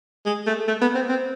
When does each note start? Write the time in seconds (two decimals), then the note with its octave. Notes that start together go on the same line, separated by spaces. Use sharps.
0.26 G#3
0.47 A3
0.68 A3
0.82 B3
0.95 C4
1.09 C4